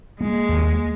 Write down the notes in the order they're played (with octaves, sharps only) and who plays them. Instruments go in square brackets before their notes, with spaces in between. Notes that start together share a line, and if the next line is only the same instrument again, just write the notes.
[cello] G#3 [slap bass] A#3
[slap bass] D#2